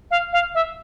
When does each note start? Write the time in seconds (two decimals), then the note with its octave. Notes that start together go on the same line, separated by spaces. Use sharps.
0.11 F5
0.33 F5
0.55 E5